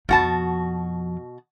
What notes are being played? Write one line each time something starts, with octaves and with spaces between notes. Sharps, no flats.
F2 B2 F3 F#4 A5